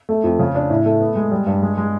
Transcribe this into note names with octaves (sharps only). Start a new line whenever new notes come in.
A3
F2
C#3
D4
A2
A3
B3
G#3
G3
G2
G#3
G#3